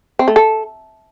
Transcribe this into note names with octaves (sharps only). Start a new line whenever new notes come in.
C4
A3
A4